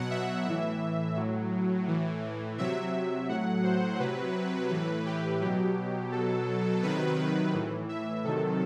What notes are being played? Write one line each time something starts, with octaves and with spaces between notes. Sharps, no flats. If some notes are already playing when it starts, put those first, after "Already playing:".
Already playing: B2 F#3 F#5
E5
A2 E3 E5
A2 F#3
A2 E3
C3 F#3 E5
A2 F#3 F#5
C5
C3 F#3 B4
A2 E3
G4
B2 F#3 G4
B2 F#3 A4
C3 D#3 F#3 B4
A2 E3
E5
C3 D#3 F#3 A4